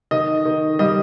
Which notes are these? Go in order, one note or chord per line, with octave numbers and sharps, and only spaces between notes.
D#3 D#5
D#3
G3 D#5